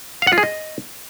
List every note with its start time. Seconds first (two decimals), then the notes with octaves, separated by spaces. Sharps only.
0.22 F5
0.27 F#5
0.33 F4
0.38 G#4
0.43 D#5